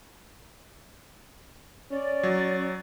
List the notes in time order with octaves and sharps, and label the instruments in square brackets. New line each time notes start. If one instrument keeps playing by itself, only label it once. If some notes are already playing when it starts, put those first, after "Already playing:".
[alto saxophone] C#4 [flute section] D5
[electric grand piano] F#3